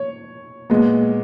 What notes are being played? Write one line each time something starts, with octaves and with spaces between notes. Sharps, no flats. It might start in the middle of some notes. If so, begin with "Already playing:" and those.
Already playing: C#5
A#2 G#3 B3